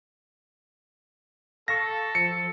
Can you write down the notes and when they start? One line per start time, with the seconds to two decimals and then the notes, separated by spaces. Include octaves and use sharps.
1.68 A4 F5 A5 C#6 A#6
2.15 F3 C#7